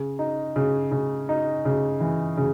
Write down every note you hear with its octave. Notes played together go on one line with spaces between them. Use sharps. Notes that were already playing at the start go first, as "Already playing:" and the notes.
Already playing: C#3
D#4
C#3
C#3
D#4
C#3
E3
C#3